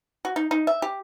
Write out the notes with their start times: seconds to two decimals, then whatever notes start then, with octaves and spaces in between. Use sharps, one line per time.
0.25 F#4
0.36 D#4
0.51 D#4
0.67 E5
0.82 G4